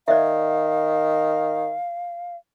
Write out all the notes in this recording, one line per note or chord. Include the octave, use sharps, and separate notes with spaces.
D#3 D5 E5 F5